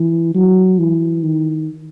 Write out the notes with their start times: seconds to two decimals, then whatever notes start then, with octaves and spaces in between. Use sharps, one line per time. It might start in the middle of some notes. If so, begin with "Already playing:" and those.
Already playing: E3
0.35 F#3
0.79 E3
1.23 D#3